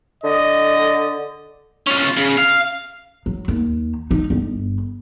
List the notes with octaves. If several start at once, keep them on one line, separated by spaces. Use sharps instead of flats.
D3 D#5
C#4 F4
C#3
F5
F#3
D#2
D#4
G1